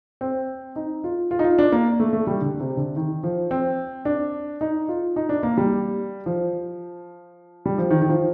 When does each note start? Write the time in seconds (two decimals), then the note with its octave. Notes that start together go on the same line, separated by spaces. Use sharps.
0.21 C4
0.76 D#4
1.04 F4
1.31 F4
1.39 D#4
1.44 F4
1.59 D4
1.72 A#3
2.00 A3
2.13 A3
2.27 G3
2.42 D3
2.60 C3
2.77 D3
2.96 D#3
3.24 F3
3.51 C4
4.05 D4
4.61 D#4
4.89 F4
5.16 D#4
5.29 D4
5.43 A#3
5.58 G3
6.26 F3
7.66 G3
7.78 F3
7.91 D#3
8.02 D#3
8.10 F3